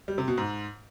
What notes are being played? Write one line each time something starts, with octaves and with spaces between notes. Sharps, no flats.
G3
C3
B2
G#2